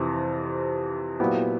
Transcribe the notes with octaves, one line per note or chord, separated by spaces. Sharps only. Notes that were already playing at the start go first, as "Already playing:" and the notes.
Already playing: F2 C3 E3
A#2 F#3 B3 E4 G4